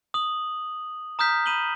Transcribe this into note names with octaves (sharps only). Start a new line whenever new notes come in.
D#6 F#7
A#5 D#6 F6 G6 B6
B5 D#7 E7 F#7 G7